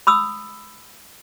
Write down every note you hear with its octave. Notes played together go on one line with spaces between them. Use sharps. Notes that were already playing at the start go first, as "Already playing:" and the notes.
B5 D#6 E6